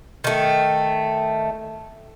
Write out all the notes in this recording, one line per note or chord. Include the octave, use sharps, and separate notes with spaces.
D#3 A3